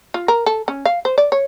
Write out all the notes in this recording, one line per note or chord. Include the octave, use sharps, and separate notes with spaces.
F4
A#4
A4
C#4
F5
C5
D5
C#5